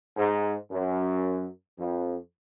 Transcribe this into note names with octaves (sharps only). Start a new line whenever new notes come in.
G#2
F#2
F2